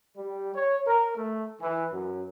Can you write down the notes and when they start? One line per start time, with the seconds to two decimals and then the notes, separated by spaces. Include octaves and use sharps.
0.17 G3
0.55 C#5
0.87 A#4
1.17 A3
1.61 E3
1.93 F#2